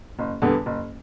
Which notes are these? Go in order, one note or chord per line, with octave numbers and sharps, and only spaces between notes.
F#1
E2 D3 G3 B3
F#1